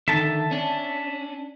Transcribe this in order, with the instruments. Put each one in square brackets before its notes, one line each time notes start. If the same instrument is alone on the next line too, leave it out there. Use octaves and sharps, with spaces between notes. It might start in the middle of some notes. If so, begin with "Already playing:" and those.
[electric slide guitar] D3 D#3 [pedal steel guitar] E5 A5
[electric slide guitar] C#4 D4